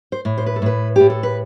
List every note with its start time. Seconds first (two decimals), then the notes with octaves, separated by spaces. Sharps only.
0.12 C5
0.25 A2
0.38 C5
0.46 B4
0.56 A4
0.62 A2 B4
0.96 A2 G4
1.10 A4
1.23 B4